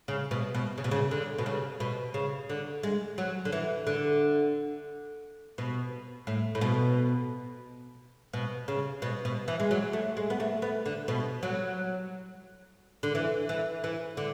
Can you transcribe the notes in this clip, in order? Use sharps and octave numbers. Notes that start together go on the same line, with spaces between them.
C#3
B2
B2
C#3
B2
C#3
D3
B2
C#3
B2
C#3
D3
G#3
F#3
D3
E3
D3
B2
A2
A2
B2
B2
C#3
B2
B2
E3
G#3
F#3
A3
G#3
B3
A3
B3
D3
B2
F#3
D3
E3
E3
E3
D3